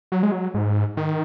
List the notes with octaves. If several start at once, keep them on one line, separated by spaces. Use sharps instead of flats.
F#3
G#3
F#3
G#2
D#3